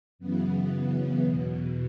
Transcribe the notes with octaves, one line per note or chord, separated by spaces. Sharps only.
F#2 C#3 E3 B3
E2 B2